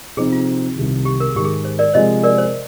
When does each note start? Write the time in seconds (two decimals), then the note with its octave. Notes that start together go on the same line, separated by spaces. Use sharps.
0.17 C3 F3 C4 D#4 G#4
0.33 F4
0.76 C2 C3 D#3
1.05 G4
1.20 A#4
1.29 G#4
1.35 G#2 D#3 G#3 G4
1.44 G#4
1.65 C5
1.79 A#4 D5
1.94 C3 F3 G#3 C5 D#5
2.23 A#4 D5
2.38 C5